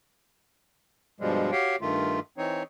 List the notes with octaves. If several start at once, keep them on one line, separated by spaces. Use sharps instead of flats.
G2 B2 F3 G3 G#3
F#4 G4 C#5 F5 G5
G2 D#3 A3 F4
E3 C4 D#4 C#5